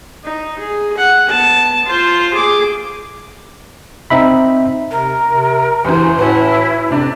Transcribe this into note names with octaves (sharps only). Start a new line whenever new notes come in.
D#4
G#4
F#5
B3 A5
F4 C5
G#4 D6
C4 D#4 E5 B5
C3 A#4
C3
E2 C#3 E3 G4 C5
A2 C#4 E4 F#4 B4
F2 C3 D4